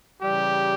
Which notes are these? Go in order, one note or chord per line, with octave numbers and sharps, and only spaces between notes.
C#3 E3 G3 G4